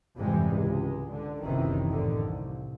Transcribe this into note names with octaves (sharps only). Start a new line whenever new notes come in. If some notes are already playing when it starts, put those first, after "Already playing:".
F2 G#2 C3 E3 G3 G#3
C#2 G#3
D3
F#1 C#2 C3 D#3 E3
F2 A2 D3 D#3
C2